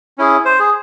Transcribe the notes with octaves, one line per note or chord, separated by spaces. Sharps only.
C#4 E4 G#4
C5
G#4